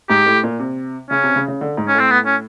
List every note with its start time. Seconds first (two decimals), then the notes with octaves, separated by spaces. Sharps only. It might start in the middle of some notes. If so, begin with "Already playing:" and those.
0.10 G#2 G4
0.26 A2
0.43 A#2
0.59 C3
1.11 C#3 C#4
1.23 C3
1.36 C#3
1.48 C#3
1.61 D3
1.77 G#2
1.88 C#4
1.94 A2
2.00 C4
2.11 B3
2.26 C#4